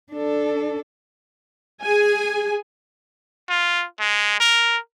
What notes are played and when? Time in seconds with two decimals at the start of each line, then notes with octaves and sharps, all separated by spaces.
0.12 D4 A4
1.83 G#4 G#5
3.49 F4
3.99 G#3
4.40 A#4